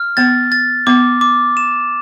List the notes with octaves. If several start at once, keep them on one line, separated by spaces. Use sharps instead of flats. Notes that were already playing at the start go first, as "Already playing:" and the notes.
Already playing: F6
B3 A6
A6
B3 D6
D6
E7